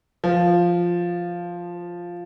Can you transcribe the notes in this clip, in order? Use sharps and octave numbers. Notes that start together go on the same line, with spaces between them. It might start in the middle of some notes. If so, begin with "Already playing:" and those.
F3